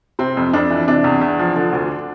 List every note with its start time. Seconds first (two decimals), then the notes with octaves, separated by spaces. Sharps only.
0.19 C3 C4
0.37 F2
0.53 F2 D4
0.70 E3
0.88 C3 D4
1.04 E2
1.21 E2
1.39 F3
1.56 D3
1.72 D2